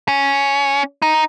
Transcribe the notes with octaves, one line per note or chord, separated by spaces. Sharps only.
C#4
D#4